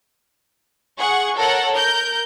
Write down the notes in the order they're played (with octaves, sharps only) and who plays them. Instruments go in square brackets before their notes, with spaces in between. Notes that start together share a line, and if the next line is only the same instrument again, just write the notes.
[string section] G#4 F#5 C#6
A4 A#4 C#5 F#5
A#4 G6